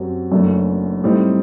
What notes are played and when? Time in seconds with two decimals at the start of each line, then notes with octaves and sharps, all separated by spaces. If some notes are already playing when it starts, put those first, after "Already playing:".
Already playing: F#2 F#3 C4 G4
0.31 F#1 F#2 F#3 A3 D4
1.04 A2 G3 C4 D#4